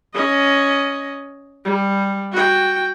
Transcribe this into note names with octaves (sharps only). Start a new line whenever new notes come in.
C#4 D#5
G3
F#4 G5